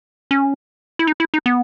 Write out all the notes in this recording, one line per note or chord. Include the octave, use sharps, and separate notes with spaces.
C#4
E4
D#4
E4
D#4
B3